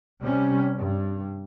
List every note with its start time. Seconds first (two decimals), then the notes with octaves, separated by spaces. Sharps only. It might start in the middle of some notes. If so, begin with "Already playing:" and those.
0.22 C3 G3 C#4
0.77 G2